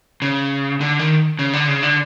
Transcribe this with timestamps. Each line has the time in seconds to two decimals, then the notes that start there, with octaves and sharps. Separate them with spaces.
0.22 C#3
0.81 D3
0.99 D#3
1.39 C#3
1.53 D3
1.68 C#3
1.83 D3